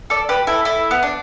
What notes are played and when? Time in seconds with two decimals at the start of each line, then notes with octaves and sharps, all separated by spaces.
0.10 A4 D5
0.29 G4 B4
0.47 E4 A4
0.65 E4 A4
0.91 B3
1.03 D4